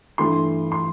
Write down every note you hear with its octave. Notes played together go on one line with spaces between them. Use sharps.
G2 E3 A3 E4 C6
C6